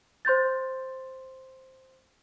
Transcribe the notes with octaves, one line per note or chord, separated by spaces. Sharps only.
C5 C6 G6 A6